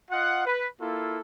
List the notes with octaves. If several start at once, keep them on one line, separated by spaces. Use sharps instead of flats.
F4 D#5 F#5
B4
A#3 E4 F4 A4